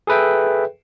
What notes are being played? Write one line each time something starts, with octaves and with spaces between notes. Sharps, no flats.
G#4 A4 B4 E5 G5